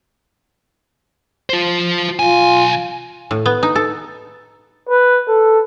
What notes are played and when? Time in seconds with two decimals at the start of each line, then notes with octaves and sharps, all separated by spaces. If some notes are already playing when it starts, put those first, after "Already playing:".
1.50 F4 C5
2.19 B1 F4 G#5
3.31 A2
3.46 B3
3.63 D#4
3.75 A4
4.89 B4
5.28 A4